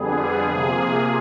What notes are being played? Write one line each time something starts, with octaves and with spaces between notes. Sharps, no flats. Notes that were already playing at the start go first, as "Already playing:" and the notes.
Already playing: F2 D3 G3 B3 G#4
C3 F3 A#3 G#4